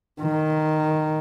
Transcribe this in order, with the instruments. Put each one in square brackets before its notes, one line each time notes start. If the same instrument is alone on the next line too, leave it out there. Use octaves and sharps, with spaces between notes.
[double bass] D#3